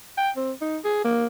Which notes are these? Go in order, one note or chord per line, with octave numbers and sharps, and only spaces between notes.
G5
C4
D#4
G#4
A#3